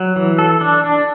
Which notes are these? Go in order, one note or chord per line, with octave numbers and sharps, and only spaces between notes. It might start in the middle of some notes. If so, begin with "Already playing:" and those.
Already playing: F#3
E3
A4
D4
D4